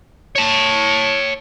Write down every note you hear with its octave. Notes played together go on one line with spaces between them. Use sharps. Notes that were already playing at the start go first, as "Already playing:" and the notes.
C#5 A5